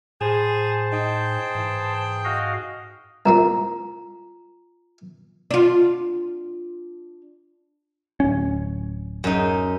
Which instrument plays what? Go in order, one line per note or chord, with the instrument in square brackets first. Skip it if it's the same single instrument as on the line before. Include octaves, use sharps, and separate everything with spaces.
[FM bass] A2 [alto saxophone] G#4 [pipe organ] C5 A5
[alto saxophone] D#4 [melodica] G#4 G5
[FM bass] G#2 [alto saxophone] E3
[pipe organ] F#4 D#5 F5
[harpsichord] C2 A#2 C4 [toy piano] F4 A#5
[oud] D4 F4
[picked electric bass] D1 C#4
[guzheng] F#2 D#4